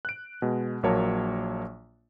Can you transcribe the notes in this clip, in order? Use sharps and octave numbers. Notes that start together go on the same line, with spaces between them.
F#6 D7
B2 G#3
A#1 F#3 A#3 C#5 A5